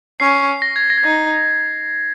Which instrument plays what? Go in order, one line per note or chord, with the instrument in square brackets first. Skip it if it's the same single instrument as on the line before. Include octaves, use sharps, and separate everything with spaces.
[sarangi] C#4 [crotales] C7
[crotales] A#6
G#6
A#6
G#6
[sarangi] D#4 [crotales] A#6